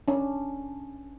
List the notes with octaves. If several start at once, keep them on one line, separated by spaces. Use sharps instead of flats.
C#4 D4